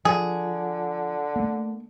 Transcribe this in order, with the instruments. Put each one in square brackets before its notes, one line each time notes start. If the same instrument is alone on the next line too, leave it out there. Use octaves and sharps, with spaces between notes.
[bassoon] D3 [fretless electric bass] F3 [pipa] G#4
[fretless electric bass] A3 A#3